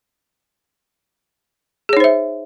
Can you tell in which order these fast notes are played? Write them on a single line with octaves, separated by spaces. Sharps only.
G#4 C#5 D#4 C5 E5